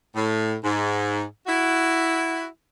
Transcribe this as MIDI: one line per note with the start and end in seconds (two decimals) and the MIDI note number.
0.14 0.54 45
0.63 1.22 44
1.47 2.45 64
1.47 2.45 66